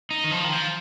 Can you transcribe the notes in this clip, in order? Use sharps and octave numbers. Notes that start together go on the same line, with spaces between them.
D#4
D#3
F3
D#3
F3